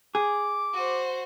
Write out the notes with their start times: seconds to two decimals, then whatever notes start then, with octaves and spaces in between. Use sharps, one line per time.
0.15 G#4 D6
0.73 F#4 C5